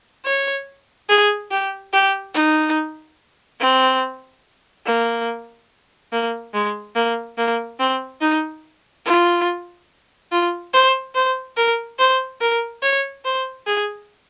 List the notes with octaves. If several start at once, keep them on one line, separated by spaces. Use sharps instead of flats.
C#5
G#4
G4
G4
D#4
C4
A#3
A#3
G#3
A#3
A#3
C4
D#4
F4
F4
C5
C5
A#4
C5
A#4
C#5
C5
G#4